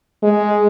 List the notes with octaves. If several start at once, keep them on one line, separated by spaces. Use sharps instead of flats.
G#3